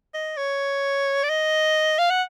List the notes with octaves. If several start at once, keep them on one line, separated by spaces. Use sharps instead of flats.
D#5
C#5
D5
D#5
F5
F#5